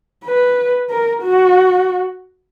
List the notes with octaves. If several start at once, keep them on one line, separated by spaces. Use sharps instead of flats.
B4
A#4
F#4